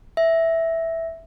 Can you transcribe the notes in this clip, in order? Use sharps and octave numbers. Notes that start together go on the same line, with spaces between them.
E5